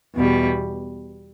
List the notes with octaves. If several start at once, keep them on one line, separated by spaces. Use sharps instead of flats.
E2 B2 G3